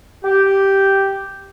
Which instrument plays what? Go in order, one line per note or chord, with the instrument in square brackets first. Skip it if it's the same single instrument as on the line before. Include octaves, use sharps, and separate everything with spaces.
[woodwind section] G4